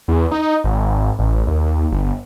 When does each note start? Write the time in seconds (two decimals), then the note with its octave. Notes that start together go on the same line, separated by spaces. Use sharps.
0.08 E2
0.31 D#4
0.64 G#1
1.19 A1
1.47 D#2
1.92 G1